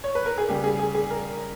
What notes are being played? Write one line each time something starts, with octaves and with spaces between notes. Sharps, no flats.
C#5
B4
A#4
G#4
C#3 G3 G4
G#4
G#4
G#4
A#4